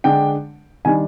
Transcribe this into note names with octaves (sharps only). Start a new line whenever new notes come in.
D3 G#3 D4 G5
D#3 G3 D4 G#5